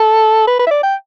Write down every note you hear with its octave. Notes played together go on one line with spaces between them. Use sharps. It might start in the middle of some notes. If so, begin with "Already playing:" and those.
Already playing: A4
B4
B4
E5
D5
G5